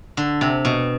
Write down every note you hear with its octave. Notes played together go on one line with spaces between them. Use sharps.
D3
C3
B2